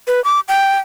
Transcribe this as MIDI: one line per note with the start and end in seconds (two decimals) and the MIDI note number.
0.07 0.23 71
0.24 0.40 86
0.48 0.79 79